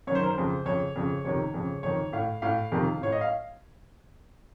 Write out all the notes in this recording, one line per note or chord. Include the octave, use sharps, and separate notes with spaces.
F#2 D#3 C5 C#5
A#4
C5
F2 C#3
F2 C#3 C#5
F2 C#3
F2 C3 D#3 C#5
F2 C#3
F2 D#3 C#5
A2 F5
A2 F5
F2 C3 D#3
A2 C#5
D#5
F5